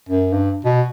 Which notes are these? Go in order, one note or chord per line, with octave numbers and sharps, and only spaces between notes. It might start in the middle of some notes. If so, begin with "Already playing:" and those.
F#2
G2
B2